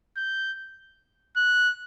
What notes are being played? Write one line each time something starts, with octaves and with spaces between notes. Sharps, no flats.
G6
F#6